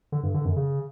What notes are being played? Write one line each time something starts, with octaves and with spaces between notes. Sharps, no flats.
D3
G2
D3
F#2
C#3